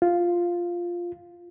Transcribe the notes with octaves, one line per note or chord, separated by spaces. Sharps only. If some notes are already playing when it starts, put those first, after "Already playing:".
F4